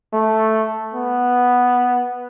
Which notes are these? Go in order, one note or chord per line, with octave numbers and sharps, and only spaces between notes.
A3
B3